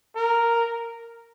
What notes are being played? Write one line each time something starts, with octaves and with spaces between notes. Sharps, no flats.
A#4